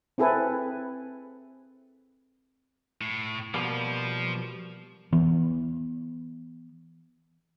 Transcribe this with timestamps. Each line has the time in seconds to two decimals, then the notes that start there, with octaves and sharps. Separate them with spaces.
0.18 C4 E4 G#4 A4 B4 G#5
3.01 A2
3.54 B2 F3 G3 A#3
5.13 E3 B3